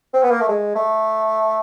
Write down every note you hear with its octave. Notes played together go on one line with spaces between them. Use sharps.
C4
B3
A#3
A3
G#3
A3